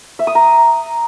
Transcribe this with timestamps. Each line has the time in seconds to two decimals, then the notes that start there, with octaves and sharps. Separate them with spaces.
0.19 E5
0.27 D#6
0.35 A#5